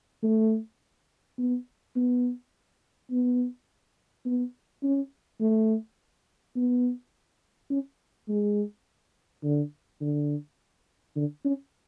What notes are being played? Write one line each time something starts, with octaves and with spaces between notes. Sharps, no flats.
A3
B3
B3
B3
B3
C#4
A3
B3
C#4
G#3
D3
D3
D3
C#4